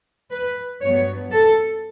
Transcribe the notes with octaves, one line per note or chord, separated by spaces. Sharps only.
B4
G2 F#3 B3 C#5
A4